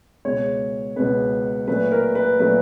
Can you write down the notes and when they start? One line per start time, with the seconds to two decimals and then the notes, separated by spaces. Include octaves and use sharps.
0.25 C#2 B2 G#3 C#5
0.96 C#2 B2 G#3 B4
1.67 A#2 F#3 A3 B4
1.92 A#4
2.15 B4
2.40 A#2 F#3 A3 B4